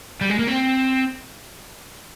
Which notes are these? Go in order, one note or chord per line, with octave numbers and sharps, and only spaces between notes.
G3
G#3
A#3
C4